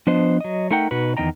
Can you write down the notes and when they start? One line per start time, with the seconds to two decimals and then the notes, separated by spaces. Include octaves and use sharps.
0.07 F3 B3 D4 C5 D#5
0.40 F#3 D#5
0.71 A3 D#4 A#4 F#5 G5
0.91 B2 D#4 F#4 B4
1.17 E2 D#3 B3 D#5 G5 A#5